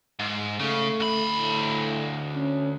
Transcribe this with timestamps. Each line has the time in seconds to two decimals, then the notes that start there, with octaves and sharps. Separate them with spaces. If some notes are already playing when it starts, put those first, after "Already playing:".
0.19 G#2
0.60 C#3 A3
1.00 D2 B5
1.36 A2
2.35 C#4